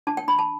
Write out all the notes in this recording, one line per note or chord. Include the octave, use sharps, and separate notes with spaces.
D4 A5
G5
D4 B5
A5